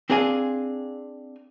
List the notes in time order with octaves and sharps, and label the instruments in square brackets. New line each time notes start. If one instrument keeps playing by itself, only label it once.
[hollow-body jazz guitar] C4 D4 G#4 F5 G#5